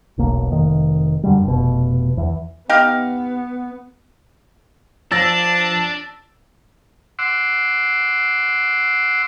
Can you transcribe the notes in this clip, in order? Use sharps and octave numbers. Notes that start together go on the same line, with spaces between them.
E1 B1 A#3
F1 D#3
F#2 D3 G3
F1 B2
E2
B3 D#4 G4 F5
F3 D4 A5 E6 A6 A#6
F#5 C6 D6 E6